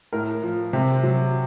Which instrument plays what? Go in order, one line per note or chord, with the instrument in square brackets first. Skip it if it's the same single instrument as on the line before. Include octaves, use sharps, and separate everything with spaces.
[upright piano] A2 A#4
F3
C3
F#3